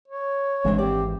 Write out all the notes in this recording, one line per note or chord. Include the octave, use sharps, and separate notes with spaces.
C#5
G#1 E3 G#3 C4 D4
C4 G4 D5